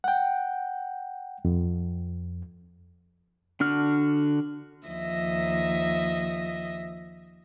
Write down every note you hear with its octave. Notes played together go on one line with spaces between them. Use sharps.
F#5 G5
F2
D3 D4 F#4 F6
D#2 F3 D#5 E5 A#6